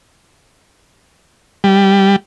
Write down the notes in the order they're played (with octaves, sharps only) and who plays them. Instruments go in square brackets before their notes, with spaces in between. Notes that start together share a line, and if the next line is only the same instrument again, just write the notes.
[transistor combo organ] G3